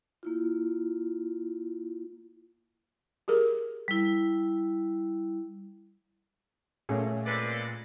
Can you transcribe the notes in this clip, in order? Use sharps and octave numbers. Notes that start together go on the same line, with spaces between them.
A#3 E4 F4
G4 G#4 A#4
G3 E4
A#2 A3 C#4 G#4
G#3 C4 A4 B4 D5